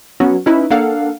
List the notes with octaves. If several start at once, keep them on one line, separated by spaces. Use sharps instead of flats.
F#3 B3 C#4 F#4
C#4 D#4 E4 B4
A#3 D4 A4 F5 F#5